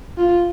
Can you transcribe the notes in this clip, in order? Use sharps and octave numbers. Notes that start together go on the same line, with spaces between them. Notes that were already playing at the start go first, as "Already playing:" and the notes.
F4